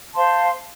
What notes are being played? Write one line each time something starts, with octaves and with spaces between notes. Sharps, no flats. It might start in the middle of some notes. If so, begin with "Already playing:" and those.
C5 F5 A5 C6